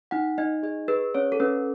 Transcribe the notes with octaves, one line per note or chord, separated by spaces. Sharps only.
D#4 F#5
D#4 D#5
G#4 D#5
G#4 B4
C#4 C#5
A4
C#4 B4